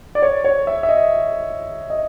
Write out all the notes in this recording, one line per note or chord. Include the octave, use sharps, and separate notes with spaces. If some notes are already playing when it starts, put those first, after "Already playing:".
D5
C#5
C#5
E5
E5
D#5
D#5